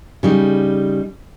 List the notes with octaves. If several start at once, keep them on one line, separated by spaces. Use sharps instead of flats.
C#3 G3 D#4